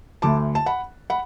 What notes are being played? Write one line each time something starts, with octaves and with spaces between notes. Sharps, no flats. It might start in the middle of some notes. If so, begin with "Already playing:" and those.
D2 D3 A3 A5 D6
A5
F#5 B5
F#5 B5